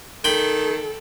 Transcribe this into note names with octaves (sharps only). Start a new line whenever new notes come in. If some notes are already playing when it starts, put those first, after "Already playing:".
D#3 A4 G5 B5